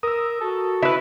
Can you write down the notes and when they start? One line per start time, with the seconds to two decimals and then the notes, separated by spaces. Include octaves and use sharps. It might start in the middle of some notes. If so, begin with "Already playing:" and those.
0.03 A#4 D#6 E6
0.41 F#4 A4
0.82 E4 B4